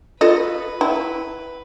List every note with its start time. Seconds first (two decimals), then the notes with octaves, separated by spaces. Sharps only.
0.21 F4 A4 B4 D#5
0.81 E4